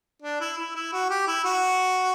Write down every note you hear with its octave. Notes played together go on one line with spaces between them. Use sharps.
D4
E4
E4
E4
F#4
G4
E4
F#4